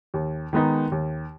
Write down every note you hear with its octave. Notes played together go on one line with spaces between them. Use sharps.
D#2
D#3 G#3 B3 D#4
D#2